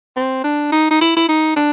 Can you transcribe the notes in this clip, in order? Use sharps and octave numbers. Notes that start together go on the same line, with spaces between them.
C4
D4
D#4
D#4
E4
E4
D#4
D4